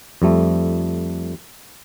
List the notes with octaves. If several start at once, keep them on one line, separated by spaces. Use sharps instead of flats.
F2 G3 A3